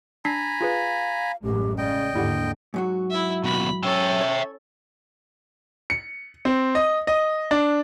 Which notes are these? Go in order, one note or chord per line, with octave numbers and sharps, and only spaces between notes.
D4 G#5 A#5 B5 B6 C7
F4 G#4 B4 F5
A1 F#2 G#3 G4
C#3 D5 D#5 G5
D#2 G#2 D3 E4 G4 F#5
G#2 F#3 F#4
E4 E5
D#2 B2 B5
C#4 A4 E5 G5
C#5
C#7
C4
D#5
D#5
D4